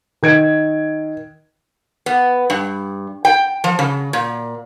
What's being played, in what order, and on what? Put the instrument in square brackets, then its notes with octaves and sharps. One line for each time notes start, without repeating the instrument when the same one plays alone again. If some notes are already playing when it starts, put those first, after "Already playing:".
[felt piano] D#3 G#6 D7
[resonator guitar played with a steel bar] B3
G2
G5
F3
C#3
A#2